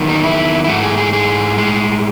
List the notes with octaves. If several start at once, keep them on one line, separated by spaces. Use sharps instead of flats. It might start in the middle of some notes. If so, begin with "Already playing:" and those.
Already playing: E2 D#3 F#3
D#4
E4
E4
G#2 E3 A3 F#4
G#4
G#4
G#4
A2 G#3